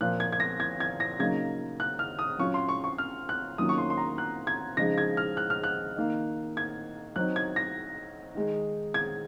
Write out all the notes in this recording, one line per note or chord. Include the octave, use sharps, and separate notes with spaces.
A#2 F3 A#3 F4 F#6
G#6
G#6
A#6
G#6
G#6
A#6
C#3 F#3 A#3 D#4 G#6
F#6
F6
D#6
F#3 C#4 F4 C#6
C6
C#6
C#6
F6
F#6
D#3 F#3 A#3 C#4 F4 D#6
C#6
C6
C6
A#5
F#6
G#6
C#3 F3 G#3 D#4 A#6
G#6
F6
F#6
F6
F#6
D#3 A#3 D#4
G#6
F#3 C4 D#4 F#6
G#6
A#6
D#3 G#3 D#4
G#6